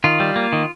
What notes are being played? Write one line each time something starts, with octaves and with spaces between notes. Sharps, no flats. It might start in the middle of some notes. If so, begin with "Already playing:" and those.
D#3 F4
G3
A#3
D#3